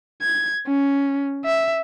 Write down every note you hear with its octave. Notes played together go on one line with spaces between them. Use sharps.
G#6
C#4
E5